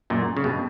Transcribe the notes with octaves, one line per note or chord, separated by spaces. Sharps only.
F#2 A#2
C#3
G2 B2